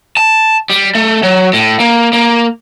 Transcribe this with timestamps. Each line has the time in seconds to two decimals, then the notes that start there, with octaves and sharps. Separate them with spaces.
0.17 A5
0.70 G3
0.95 A3
1.23 F#3
1.53 A2
1.80 A#3
2.13 A#3